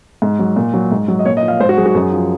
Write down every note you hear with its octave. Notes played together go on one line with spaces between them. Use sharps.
G#2
F#3
A#2
F#3
G#2
F#3
D#5
A#2 C#5
D#5
F3
F5
G#2 C5
F#4
F#3 G#4
F#4
F#2 G#4
F3